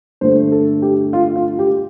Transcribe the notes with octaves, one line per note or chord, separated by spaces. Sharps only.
G2 D3 A3 C5
A4
G4
F4
F4
G4